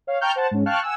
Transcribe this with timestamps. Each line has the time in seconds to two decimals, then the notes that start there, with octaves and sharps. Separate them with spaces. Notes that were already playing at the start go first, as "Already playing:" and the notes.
0.07 C#5 F5
0.21 G5 A5 A#5 C#6 F6 G6
0.36 C5 F#5 A5
0.51 G#2 C#4
0.66 F5 G5 A5 C#6 F6 F#6
0.83 F#5 G#5 E6